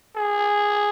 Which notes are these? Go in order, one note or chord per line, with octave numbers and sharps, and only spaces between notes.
G#4